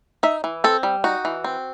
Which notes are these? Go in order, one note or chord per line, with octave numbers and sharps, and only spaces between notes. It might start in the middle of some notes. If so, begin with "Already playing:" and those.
D#4 E5
E3
C4 A4
G3
D#4 F#4
E3
C4